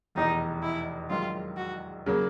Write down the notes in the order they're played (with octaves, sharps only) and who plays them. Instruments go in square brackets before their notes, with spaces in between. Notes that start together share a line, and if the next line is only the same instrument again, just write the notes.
[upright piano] F1 E2 B2 [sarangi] D#4
[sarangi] E4
[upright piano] A#1 G#2 D#3 F#3 [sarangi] F4
[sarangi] F#4
[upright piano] C#3 F#3 A#3